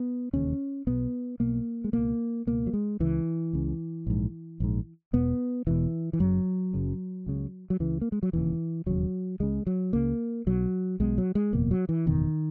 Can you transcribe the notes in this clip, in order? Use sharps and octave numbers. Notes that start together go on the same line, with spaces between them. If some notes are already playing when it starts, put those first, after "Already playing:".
Already playing: B3
E1 D#2 C#3 C#4
B1 B2 B3
B1 B2 A#3
G#3
C#2 B2 A#3
C#2 B2 A#3
F#3
G#3
C#2 C#3 E3
C#2 C#3
A#1 G#2
A#1 G#2
E1 E2 B2 B3
E1 E2 B2 E3
E3
F#1 F#2 C#3 F#3
F#1 F#2 C#3
C#2 C#3
F#3
C#2 C#3 E3
A#3
G#3
F#3
E1 D#2 C#3 E3
E1 D#2 C#3 F#3
C#2 C#3 G#3
F#3
C#2 C#3 A#3
B1 B2 F#3
B1 B2 G#3
F#3
G#3
F#1 E2 B2 A#3
F#3
E3
F#1 E2 B2 D#3